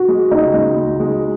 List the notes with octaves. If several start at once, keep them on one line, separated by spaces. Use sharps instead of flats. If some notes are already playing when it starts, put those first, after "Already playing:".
Already playing: F#4
G#3
C#2 D#4
C#2
C#2
G#3